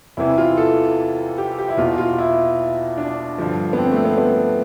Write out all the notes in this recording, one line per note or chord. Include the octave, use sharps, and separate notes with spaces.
E2 C3 E3 E4
F4
A4
G4
G4
E4
E2 B2 F4
F4
E4
D4
G2 D3 F3
B3
C4
A3
B3
B3